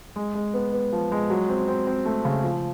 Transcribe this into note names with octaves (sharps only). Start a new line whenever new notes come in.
G#3
G#3
B3
B3
F3
G#3
F#3
C4
C4
C4
A3
C#3
F3